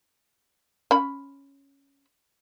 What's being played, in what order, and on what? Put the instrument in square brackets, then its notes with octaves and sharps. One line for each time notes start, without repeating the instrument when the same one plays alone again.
[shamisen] C#4 B5